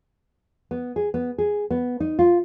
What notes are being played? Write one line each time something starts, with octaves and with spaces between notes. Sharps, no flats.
B3
G#4
B3
G#4
B3
D#4
F4